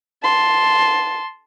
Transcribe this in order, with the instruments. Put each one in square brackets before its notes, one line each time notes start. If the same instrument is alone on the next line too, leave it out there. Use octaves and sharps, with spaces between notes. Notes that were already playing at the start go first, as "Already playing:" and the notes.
[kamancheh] A5 C6